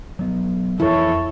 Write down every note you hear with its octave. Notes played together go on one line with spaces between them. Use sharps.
F#3 B3
F2 E3 E4 A4 C#5